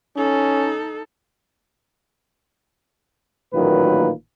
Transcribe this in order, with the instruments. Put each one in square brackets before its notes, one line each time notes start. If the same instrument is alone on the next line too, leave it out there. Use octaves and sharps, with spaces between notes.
[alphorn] C#4 [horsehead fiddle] D#4 A4
[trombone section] A1 A#2 D#3 F#3 A#3 B4